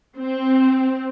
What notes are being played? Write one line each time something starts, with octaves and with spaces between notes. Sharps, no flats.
C4